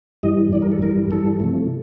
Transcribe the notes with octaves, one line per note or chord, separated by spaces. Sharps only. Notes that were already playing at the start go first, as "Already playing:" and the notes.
G2 E3 G3 D#5
G2 E3 G3 D5
A#4
A4
G2 E3 G3 A#4
G2 E3 G3 A4
C3 F3 A3